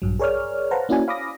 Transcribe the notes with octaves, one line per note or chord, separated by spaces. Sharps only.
A#1 G2 F#3
G#4 A#4 C#5 D5 F6
B4 C5 F5 F#5 A5 A#5
A#3 C#4 E4 F#4 D5 G#5
F5 B5 D6 D#6 A#6